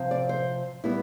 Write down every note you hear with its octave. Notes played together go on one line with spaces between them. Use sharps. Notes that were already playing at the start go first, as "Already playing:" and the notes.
Already playing: C3 F3 C4
D5
C5
G3 B3 E4